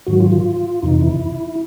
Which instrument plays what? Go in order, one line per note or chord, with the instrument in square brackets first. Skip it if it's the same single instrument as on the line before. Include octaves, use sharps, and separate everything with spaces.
[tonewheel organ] G#2 D#3 F#3 F#4
F4
F4
F2 C3 E3 D#4
E4